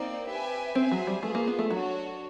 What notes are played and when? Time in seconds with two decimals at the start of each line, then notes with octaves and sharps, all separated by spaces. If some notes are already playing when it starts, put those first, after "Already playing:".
Already playing: A#3 C4 D#4 D5
0.29 G4 B4 E5 G#5
0.75 C4 G#4 C5 E5 G#5
0.91 F#3
1.07 G3
1.23 A3 F4 G#4 B4
1.35 A#3
1.47 B3
1.59 A3
1.70 F#3 D4 F#4 A4 C#5